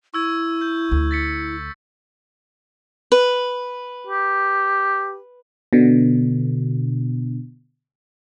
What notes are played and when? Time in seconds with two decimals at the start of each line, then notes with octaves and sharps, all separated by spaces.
0.14 E4 C#6 E6 G#6
0.61 G6
0.91 D2
1.11 A6 B6 C#7
3.12 B4
4.07 G4
5.73 B2 D3